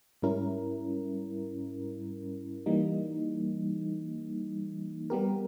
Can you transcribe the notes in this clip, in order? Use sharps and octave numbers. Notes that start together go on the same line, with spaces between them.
G#2 G3 C#4 E4 A#4
E3 G3 A#3 D#4
G3 B3 G4 A#4